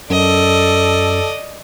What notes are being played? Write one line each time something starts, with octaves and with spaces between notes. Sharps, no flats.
F#2 A4 D5 D#5